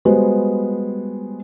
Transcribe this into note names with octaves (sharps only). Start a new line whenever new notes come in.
G3 G#3 B3 F#4 C5